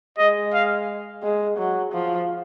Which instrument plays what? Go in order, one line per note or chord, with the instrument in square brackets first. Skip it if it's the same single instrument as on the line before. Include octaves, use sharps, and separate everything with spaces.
[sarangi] G#3 [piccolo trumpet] D#5
[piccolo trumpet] F5
[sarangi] G#3
F#3
F3